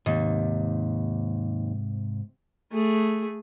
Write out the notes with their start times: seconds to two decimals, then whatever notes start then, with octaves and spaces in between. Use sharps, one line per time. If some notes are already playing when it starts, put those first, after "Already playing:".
0.06 D#2 G#2 C3
2.72 A3 G#4